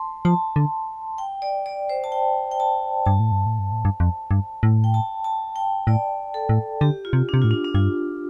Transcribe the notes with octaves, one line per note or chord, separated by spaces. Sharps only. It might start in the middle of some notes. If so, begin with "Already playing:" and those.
Already playing: A5 C6
F3 A5
D3
G5
D5
D5
C5
A5
G5
G5
A5
G2 A5
A2
G2
A2
G2
A2
G2
F2
G2
A2
G5
A5
A5
G5
A2 D5
A4
A2
D3 G4
F4
C3
C3 D4
A2 F4
D4
D4
G2 F4